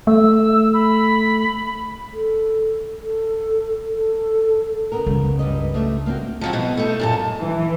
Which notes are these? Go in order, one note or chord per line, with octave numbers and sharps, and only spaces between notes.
A3 E6
B5
A4
A4
A4
C#3 B3 A#4
C#2
G2 B4 D#5
D2 A3 E5
A#3 C4 F#4
F3 F#3 C4
B2 B3
A3 D#4
F#2 A#2 A5
E3